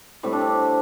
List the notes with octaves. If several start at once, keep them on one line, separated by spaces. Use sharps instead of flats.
A2 G3 C4
D4
C4